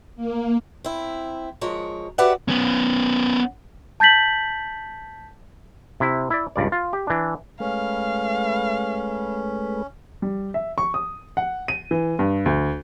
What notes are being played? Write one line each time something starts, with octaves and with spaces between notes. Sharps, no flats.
A#3
C4 E4
F3 G#3 A#4 C#5
F#4 G4 B4 D5 E5 F#5
B3 C#4
A5 G6 A6 B6 F#7
C3 E4
E4 D5
C#2 G2 D5
F4
G4
E3 D4
G#3 A3 C#4 B4 F5
G3
E5
C#6
D#6
F#5
D#7
E3
G2
D2